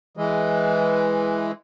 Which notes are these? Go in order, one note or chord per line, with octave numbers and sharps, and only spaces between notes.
E3 G#3